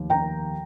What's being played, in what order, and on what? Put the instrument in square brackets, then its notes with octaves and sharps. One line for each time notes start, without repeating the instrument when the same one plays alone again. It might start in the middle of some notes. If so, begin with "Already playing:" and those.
Already playing: [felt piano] F1 D#2
G5 A#5